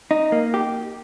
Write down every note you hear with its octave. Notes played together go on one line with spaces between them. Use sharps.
D#4
A#3
G4